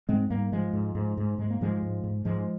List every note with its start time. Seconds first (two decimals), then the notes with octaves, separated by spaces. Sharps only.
0.09 G#2 G#3 C4
0.30 G#2 G3 A#3
0.52 G#2 F3 G#3
0.73 G#2
0.95 G#2
1.17 G#2
1.38 G#2 G#3
1.50 A#3
1.61 G#2 F3 G#3
1.82 G#2
2.04 G#2
2.25 G#2 F3 G#3